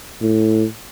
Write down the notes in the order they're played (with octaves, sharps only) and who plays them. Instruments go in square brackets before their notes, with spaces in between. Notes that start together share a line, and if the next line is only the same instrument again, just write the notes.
[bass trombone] A2